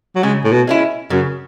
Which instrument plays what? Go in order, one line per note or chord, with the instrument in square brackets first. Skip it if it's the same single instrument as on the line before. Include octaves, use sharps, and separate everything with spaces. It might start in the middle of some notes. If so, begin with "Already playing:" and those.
[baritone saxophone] F#3
[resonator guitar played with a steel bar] C#3 [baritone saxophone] G#3
[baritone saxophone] A2
B2
[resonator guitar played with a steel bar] G#3 C#4 E4
[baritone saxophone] F#2 [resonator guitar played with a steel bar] C#3